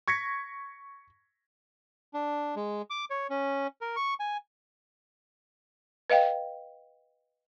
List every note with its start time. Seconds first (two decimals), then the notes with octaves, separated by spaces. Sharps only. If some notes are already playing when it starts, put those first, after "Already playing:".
0.08 C#6 G#6 A#6 B6 C#7
2.14 D4
2.56 G#3
2.90 D6
3.10 C#5
3.30 C#4
3.81 A#4
3.96 C#6
4.20 G#5
6.10 B4 D#5 F5 G5